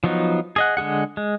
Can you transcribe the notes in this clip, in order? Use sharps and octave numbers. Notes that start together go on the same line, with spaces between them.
F3 F#3 B3 D#4
G#4 D#5 F#5
D3 G#3 G#4 F#5
G#3